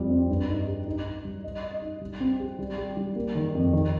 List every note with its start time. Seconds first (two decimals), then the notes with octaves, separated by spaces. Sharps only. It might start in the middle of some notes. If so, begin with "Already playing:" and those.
Already playing: F2 F3 G3
0.10 C4
0.29 G2
0.48 D#4
0.67 G4
0.87 D#4
1.06 D#4
1.25 G3
1.44 D#5
1.63 D#5
1.82 D#4
2.01 G3
2.20 C4
2.40 G4
2.59 G3
2.78 G4
2.97 G3
3.16 A#3
3.35 D#3
3.55 F2
3.73 D#3